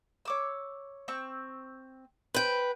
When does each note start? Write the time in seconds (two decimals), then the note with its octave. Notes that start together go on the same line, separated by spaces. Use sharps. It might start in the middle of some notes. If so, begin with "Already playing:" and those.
0.25 C#5 D6 E6
1.08 C4 C#6 E6
2.34 B4 C5 G5